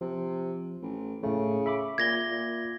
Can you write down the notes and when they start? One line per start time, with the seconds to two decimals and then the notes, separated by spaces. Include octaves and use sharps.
0.01 C3 F3
0.82 A1
1.23 A2 C#3 A3
1.66 E5 B5 D6
1.98 A#2 G#6 A#6 G7
2.31 A#2